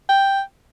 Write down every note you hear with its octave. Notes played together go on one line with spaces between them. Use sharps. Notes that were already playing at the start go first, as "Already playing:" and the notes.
G5